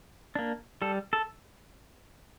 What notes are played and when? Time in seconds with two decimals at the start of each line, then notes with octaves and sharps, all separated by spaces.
0.35 A#3 D4
0.82 G3 A4
1.13 A4